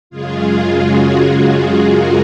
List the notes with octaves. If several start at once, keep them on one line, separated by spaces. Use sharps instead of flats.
F#2 C#3 G#3 F4 G#4
F#4
F#4
F4 G#4
F#4 A#4